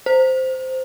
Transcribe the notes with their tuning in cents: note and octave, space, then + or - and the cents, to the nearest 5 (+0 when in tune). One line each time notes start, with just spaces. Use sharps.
C5 -10